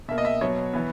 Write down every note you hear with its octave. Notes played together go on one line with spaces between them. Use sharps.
B2 A#3 E5
D#5
E5
B2 F#3 B3 C#5
E3 B3